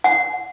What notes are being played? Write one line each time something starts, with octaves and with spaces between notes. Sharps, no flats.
F#5